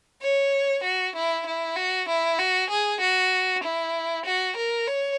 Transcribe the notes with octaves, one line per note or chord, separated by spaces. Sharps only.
C#5
F#4
E4
E4
F#4
E4
F#4
G#4
F#4
E4
F#4
A#4
C#5